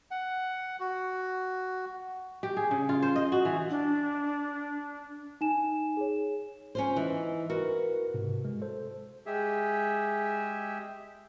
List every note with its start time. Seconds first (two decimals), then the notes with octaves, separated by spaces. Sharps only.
0.11 F#5
0.80 F#4
2.43 G4
2.57 G#4
2.71 C#3
2.89 F4
3.02 C5
3.16 D#5
3.32 F#4
3.45 E3
3.70 D4
5.41 D#4 G#5 E7
5.97 G#4 C#5
6.75 C#4 F4 C5
6.96 E3 D#4
7.50 F#4 A#4 B4
8.14 G#2 C3
8.45 G#3
8.62 A4 C5
9.26 G#3 G4 G#4 E5